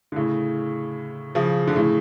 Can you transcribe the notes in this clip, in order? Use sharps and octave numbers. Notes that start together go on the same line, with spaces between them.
D3
A2 C#3
C#3 F3
D3
A2 C#3